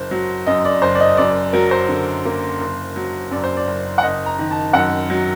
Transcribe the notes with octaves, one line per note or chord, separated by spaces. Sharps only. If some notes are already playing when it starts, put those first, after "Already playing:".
Already playing: F#1 C5
F#3
F#2 D#5
D5
F#1 C5
D5
D#5
F#2 D5
F#3 A#4
C5
D3
A#3
F#1
F#3
F#2 D5
C5
D5
F#1
F#5
F#1 D#5
A#5
D#3
A5
F#2 F#5
F#3